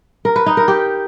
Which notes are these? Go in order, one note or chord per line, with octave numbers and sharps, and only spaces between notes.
A#4
B4
D#4
A#4
G4